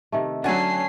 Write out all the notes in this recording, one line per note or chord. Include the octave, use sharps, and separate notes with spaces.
C3 D#3 A3
D3 F#3 C#4 D4 F#4 G#5 A5 C7